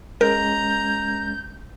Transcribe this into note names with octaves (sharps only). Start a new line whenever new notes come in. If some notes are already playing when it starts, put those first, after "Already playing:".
G#3 C#4 A#4 A#5 G6